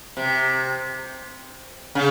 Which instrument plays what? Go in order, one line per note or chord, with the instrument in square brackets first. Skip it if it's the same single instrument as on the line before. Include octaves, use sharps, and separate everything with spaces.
[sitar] C3
C#3